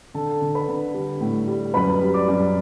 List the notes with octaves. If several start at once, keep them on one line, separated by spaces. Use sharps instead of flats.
D3 A4 A5
D3
B4 B5
D3
G3
A2
G3
F#2 B4 B5
G3
D5 D6
F#2